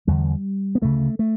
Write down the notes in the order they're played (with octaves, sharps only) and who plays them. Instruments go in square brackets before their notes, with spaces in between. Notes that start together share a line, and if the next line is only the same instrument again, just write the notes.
[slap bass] E2 D3 G3
B3
D2 C#3 A3
A3